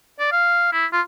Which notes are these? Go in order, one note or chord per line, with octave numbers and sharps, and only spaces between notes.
D5
F5
E4
F4